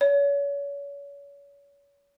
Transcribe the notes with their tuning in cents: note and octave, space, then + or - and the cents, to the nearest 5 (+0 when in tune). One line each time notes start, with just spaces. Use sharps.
C#5 +35